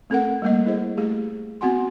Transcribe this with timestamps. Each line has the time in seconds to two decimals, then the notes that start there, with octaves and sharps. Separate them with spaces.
0.10 A3 C4 A4 A#4 F#5
0.42 G3 A3 A#3 D#5
0.66 E4 G#4 C5
0.97 A3 G4 G#4
1.61 B3 C4 F#4 F#5 G#5 C6